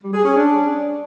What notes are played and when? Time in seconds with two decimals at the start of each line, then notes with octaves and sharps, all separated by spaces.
0.03 G3
0.14 G#4
0.25 C#4
0.36 D4